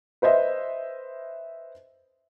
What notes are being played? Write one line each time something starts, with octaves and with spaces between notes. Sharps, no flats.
B4 C5 D#5 E5